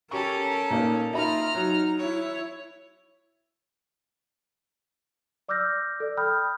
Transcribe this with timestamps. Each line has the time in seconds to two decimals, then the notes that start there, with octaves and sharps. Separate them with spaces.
0.11 C#4 G4 A4 A#4 C#6
0.70 A#2 A#3 D#4
1.13 D#4 F4 E5 A#5 B5 F6
1.55 F#3 D#4
1.99 E4 C#5
5.49 D5 D6 E6 F6 G6 A#6
6.00 A4 D5
6.17 G5 B5 D#6 F6 G6